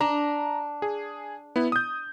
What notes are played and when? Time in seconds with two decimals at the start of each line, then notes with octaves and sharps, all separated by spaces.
0.01 D4 A#5
0.82 G#4
1.56 B3 E4
1.72 D#6 G6